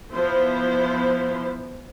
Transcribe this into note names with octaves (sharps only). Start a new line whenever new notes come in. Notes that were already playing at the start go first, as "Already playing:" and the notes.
F3 B3 E4 C5